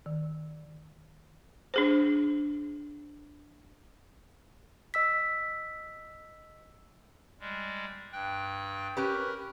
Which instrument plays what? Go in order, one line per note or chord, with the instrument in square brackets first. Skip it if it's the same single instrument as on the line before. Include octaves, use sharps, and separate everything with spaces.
[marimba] D#3
[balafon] D4 G#4 C5
[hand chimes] D#5 E6 B6
[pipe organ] G3 G#3
G2 G5 F#6
[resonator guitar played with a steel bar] C#4 G4 B4 [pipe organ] A#4 F#6